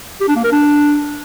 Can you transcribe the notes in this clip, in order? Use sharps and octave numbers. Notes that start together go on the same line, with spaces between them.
G4
D4
A#3
A#4
D4